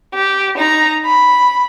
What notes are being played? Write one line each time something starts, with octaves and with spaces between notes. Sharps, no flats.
G4
D#4 A#5
B5